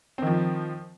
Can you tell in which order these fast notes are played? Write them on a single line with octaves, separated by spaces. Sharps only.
C4 D#3 F3